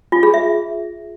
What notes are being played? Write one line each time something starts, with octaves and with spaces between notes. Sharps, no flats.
F4
G#4
E5